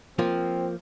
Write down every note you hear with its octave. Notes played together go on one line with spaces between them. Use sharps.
F3 A#3 C4 F4